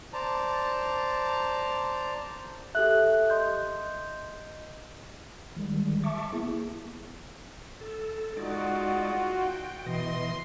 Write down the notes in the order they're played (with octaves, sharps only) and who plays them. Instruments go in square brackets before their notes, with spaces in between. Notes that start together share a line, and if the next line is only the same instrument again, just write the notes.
[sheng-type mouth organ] C5 D5 A5 A#5
[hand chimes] G4 A4 E5 [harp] F#6
[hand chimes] D#5 C6 G6
[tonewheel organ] D#3 G3 G#3
E5 A5 C#6 D6
A#3 B3 E4 G#4
A4
[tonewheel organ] G#3 D#4 D5 [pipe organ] F4 F#4
[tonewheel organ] G5
[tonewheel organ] B2 E3 D#5 [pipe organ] C6